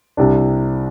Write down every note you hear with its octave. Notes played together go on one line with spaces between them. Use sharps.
C2 C3 G3 D4